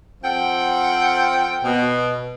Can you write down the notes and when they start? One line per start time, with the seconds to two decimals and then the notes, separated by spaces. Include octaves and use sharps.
0.23 F3 C4 A4 F#5 G5
1.63 B2